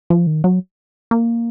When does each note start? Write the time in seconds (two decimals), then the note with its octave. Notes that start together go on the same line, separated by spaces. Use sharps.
0.10 F3
0.27 D#3
0.44 F#3
1.11 A#3